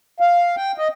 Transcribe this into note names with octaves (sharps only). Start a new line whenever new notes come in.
F5
G5
D#5